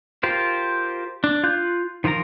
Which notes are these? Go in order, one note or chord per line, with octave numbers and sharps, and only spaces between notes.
F4 G4 A#4 C5
D4
F4 F5 F#6 G6
D#3 F3 F4 A#4 A#5